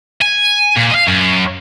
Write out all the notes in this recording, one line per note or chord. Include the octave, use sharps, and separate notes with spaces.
G#5
A#2
D#5 F5
F#2